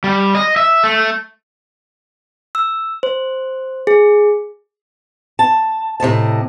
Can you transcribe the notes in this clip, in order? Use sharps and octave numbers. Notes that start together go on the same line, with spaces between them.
G3
D#5
E5
A3
E6
C5
G#4
A5
A2 C3 D#5 A5